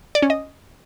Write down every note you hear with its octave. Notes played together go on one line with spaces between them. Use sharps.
D5
C#4
D#5